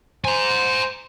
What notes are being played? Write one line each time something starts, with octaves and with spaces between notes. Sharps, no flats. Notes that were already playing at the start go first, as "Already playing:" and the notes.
C5 G#5 A#5